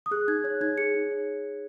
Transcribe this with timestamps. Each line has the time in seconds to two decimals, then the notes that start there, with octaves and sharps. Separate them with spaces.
0.06 D#6
0.11 G#4 F#6
0.28 D#4 G#6
0.44 C#5 F#6
0.61 D#4 G#6
0.78 G#4 C#7
0.94 D#4
1.11 C#5